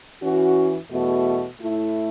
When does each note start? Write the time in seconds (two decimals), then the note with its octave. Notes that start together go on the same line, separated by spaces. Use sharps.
0.20 E3 C#4 F#4
0.90 E2 B2 A3 F#4
1.60 A2 A3 E4